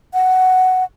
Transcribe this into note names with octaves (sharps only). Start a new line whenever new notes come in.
F#5